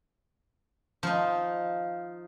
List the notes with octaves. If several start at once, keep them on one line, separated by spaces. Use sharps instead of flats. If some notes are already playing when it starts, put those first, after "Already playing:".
F3 D#4